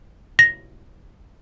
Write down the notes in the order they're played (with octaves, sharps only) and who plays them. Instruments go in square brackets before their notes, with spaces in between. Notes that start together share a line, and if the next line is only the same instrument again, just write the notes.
[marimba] A#6